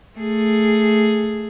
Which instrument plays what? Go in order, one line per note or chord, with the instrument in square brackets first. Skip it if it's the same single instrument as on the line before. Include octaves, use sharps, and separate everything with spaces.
[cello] A3 G#4